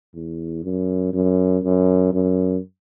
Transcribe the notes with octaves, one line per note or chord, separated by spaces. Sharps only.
E2
F#2
F#2
F#2
F#2